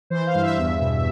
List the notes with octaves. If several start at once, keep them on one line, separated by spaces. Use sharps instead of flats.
E3 C5
F5
G2
E5
E2
B2